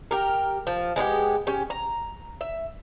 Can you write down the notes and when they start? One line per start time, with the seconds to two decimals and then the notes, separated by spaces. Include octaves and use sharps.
0.11 G4 A#4
0.67 F3
0.96 G#3 B3 E4 G4
1.47 C#4 G4
1.70 A#5
2.41 E5